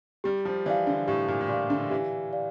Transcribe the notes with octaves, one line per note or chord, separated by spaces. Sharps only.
G3 G4
F3
E3 D5 F5
D3
A2 G4
A#2
A2
A#2 D5 F5
D3
E3 G4
D5 F5